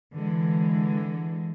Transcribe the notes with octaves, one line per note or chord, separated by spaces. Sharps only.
D3 E3 G#3